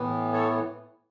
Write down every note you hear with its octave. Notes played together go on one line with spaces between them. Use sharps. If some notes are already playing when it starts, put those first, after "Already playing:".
Already playing: A2 E3 B3
A4 C#5